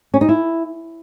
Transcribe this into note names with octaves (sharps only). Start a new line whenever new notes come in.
C#4
D#4
E4